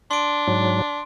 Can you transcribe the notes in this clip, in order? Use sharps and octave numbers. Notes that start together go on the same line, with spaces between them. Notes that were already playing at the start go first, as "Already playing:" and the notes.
D4 C6 D7
G#2 F#3